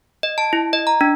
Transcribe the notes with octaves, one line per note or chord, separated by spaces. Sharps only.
D#5
A5
E4
D#5
A#5
D4